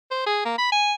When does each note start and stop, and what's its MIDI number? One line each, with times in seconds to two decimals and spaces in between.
0.11 0.25 72
0.26 0.41 68
0.45 0.57 58
0.58 0.68 83
0.72 0.94 80